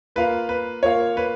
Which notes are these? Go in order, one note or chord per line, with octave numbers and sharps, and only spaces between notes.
A#3 F4 A#4 B4 F5
B4
A#3 F4 A#4 C#5 F5
B4